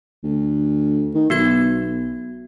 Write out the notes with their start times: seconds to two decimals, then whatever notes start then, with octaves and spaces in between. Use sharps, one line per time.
0.23 D2
1.14 D#3
1.30 B1 B3 F#4 G#6